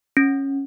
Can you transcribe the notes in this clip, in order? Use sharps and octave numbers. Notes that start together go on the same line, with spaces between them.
C#4